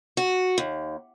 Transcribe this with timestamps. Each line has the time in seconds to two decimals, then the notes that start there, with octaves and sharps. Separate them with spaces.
0.17 F#4
0.58 D#2